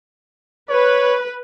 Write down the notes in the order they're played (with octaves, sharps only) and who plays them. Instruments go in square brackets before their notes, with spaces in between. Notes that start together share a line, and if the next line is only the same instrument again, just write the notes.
[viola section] B4 [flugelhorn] C#5